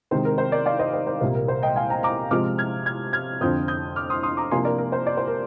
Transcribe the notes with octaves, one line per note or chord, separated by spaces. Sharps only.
C3 D#3 G#3 C4 C5
A#4
C5
A#4 D5
D5 F5
C5 D#5
C5 D#5
C5
C2 A#2 G3 A#3 C5
A#4
C5
D#5 G5
F5 G#5
G5 A#5
A#5 D6
C3 F3 G#3 C4 D6 F6
F6 G#6
F6 G#6
F6 G#6
F2 D3 F3 C4 D#6 G6
D#6 G6
D6 F6
C6 D#6
C6 D#6
A#5 D6
C3 F3 A#3 D4 G#5 C6
A#4 D5
A#4
C5
D5
C5
A#4